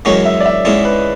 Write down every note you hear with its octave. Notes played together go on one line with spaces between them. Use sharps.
F#2 E3 G#3 C#4 F#4 C#5
E5
D5
E5
G#2 G#3 C#4 E4 D5
B4